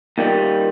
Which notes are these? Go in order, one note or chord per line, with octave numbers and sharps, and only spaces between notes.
D#2 D#3 G3